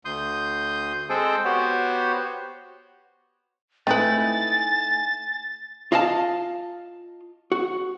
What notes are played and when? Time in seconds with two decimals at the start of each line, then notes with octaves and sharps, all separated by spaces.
0.05 D2 C6 D#6 G6
1.09 G#3 C4 G#4 A4 C5 G5
1.45 B3 F#4 G4 C5 C#5
3.87 A3 C4 D#4 E4 B4 G#5 A6
5.92 F4 D#5 F5 F#5 A5
7.52 F#4